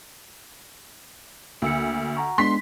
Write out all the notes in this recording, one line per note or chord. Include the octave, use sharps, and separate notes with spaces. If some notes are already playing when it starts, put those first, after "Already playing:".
D2 A#3 E6 C#7
F#5 A#5 C#6
G#3 B3 D4 C6 B6